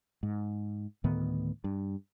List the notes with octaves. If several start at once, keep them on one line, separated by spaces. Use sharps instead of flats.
G#2
D2 A2 D#3 B3
G2